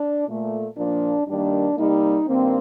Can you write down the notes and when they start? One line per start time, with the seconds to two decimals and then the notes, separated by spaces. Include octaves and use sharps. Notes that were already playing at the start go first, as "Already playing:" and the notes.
Already playing: D4
0.28 A#2 A3
0.77 A#2 F3 A#3 D4
1.27 G2 D#3 G3 A#3 D4
1.77 C3 G3 A#3 D#4
2.27 G2 D#3 A#3 C4